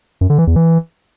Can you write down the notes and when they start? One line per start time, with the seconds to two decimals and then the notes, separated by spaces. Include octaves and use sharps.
0.21 F#2
0.30 D3
0.38 E3
0.47 E2
0.56 E3